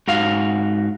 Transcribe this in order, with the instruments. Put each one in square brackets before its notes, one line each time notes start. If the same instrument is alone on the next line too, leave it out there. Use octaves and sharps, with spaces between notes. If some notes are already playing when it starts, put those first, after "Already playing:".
[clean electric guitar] G#2 F#4 F5